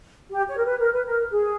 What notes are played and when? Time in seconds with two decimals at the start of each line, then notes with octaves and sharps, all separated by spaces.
0.31 G4
0.48 C#5
0.57 A#4
0.64 B4
0.80 A#4
0.92 B4
1.05 A#4
1.30 G#4